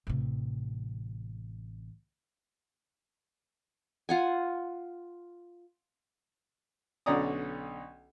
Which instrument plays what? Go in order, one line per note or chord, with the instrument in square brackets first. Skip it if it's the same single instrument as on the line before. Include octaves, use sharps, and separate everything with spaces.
[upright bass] A1 C3
[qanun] F4 F#5 G#5
[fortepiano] B1 D3 C#4 D5 A#5 D#6